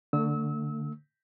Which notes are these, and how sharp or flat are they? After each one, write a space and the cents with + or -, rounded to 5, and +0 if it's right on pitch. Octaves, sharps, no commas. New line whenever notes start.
D3 +0 A3 +35 E6 -30